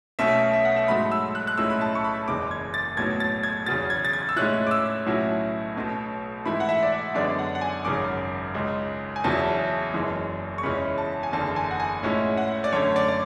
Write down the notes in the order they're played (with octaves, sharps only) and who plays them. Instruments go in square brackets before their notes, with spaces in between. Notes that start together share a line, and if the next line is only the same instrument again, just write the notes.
[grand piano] B1 B2 A3 C#4 E5
E5
F#5
E5
G#2 F#3 A3 B5
E6
F#6
F#6
B1 A2 G#3 C#4 E4 E6
B5
A5
C#6
B5
F#1 E2 C#3 G#3 D6
G#6
A6
B1 A2 F#3 B3 G#6
A6
G#6
E2 C#3 F#3 A6
G#6
A6
G#6
E6
A2 G#3 C#4 E4 F#6
D6
E6
B1 A2 F#3 C#4 E4
B1 B2 A3
G#2 E3 A3 E4 B5
F#5
E5
D5
E5
F#2 D3 G#3 B3 D4 D5
F#5
F#5
G#5
G#1 F#2 C#3 D6
C#2 C#3 G#3
G#5
E2 C#3 F#3 C#4 E4 A5
F#1 F#2 E3 G#3
C#6
E2 C#3 G#3 C#4 E4 B5
A5
G#5
F#1 E2 D3 A5
G#5
F#5
G#5
A2 G#3 C#4 E4
F#5
D5
F#2 D3 A3 C#4 C#5
D5
D5